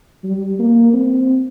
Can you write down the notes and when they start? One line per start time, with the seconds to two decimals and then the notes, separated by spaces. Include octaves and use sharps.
0.24 G3
0.59 A#3
0.93 C4